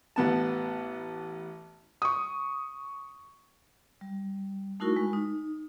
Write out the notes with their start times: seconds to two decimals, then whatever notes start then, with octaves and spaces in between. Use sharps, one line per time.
0.16 A1 B3 A5
2.02 C#6 D#6
4.01 G3
4.80 A3 D#4 E4 F#4 A#4 C#6
4.96 G#3
5.13 D#4